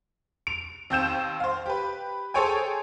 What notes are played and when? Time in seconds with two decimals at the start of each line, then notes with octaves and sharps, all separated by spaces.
0.47 D7 F7
0.90 D#2 C4 G6 E7
1.40 C5 F5
1.66 G4 B4
2.34 G#4 A4 C5 C#5 G5 G#5